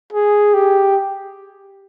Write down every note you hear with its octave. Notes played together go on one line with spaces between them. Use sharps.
G#4
G4